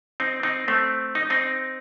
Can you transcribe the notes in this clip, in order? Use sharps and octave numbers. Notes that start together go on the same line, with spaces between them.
C4 D#4
C4 D#4
A3 C4
D#4
C4 D#4